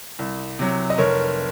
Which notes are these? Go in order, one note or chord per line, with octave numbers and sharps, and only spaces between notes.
C2
C3 F#3
D#5
F1 A#4 C#5